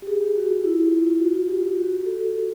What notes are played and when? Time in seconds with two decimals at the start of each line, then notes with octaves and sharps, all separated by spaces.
0.02 G4
0.07 G#4
0.21 G4
0.35 F#4
0.50 F4
0.64 E4
0.78 F4
0.92 F4
1.07 F4
1.20 F#4
1.34 F4
1.49 G4
1.63 G4
1.77 F#4
1.91 G4
2.05 A4